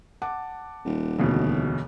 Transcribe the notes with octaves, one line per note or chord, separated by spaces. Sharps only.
F#5 A5 D6
D#1
E1 D2 B2